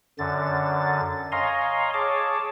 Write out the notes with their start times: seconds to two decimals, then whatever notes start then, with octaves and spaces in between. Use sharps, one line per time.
0.19 F#2 D3 A6
1.32 C#5 D#5 F5 G#5 A#5 C6
1.94 G#4 C#5 A5 D6